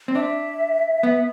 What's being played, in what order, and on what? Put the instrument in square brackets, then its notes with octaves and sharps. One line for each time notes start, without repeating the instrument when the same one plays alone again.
[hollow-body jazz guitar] C4
[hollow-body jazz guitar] D4 [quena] E5
[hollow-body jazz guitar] B3